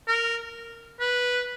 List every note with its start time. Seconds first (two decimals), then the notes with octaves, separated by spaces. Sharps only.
0.08 A#4
1.00 B4